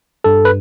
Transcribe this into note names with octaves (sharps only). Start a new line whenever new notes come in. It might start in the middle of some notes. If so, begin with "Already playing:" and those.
G2 A4
B4